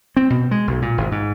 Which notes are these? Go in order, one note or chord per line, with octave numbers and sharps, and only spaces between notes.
C4
B2
G#3
B1
A#2
G#1
G#2